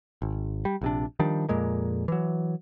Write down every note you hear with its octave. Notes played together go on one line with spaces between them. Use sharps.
G#1
G3
A#1 C3 D4
D#3 F3 G3 D4
F2 A#2 G#3 A#3
E3 F#3